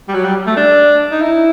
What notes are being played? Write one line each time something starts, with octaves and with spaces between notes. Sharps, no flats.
G3
F#3
G3
A3
D4
D#4
E4